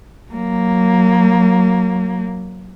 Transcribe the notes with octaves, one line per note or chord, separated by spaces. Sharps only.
F#3 A#3